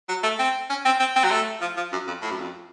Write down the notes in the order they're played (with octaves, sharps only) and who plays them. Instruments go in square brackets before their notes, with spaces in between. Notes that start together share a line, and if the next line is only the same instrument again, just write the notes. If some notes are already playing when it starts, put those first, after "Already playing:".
[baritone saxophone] F#3
A3
C4
C#4
C4
C4
C4
F#3
A3
F3
F3
F#2
F2
A2
F#2
F2